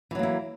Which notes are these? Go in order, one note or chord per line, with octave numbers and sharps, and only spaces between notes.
E3 F#3 A#3 E4